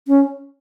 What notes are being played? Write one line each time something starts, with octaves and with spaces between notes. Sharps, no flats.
C#4